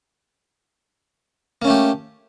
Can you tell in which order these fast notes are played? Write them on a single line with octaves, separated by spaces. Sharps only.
A#3 C#4 A3 G4